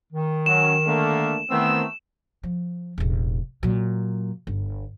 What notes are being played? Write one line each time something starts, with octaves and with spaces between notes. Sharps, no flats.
D#3
F#3 C#4 E7
D3 A3 A#3
D#3 E3 A3 B3 C4 E6
F3
E1 A1
A#2 F#3
G1